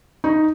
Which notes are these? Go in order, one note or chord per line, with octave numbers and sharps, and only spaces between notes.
D#4